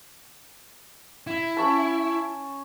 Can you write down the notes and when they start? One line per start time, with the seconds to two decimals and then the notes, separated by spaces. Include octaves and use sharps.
1.27 E4
1.57 C#4 C#5 A5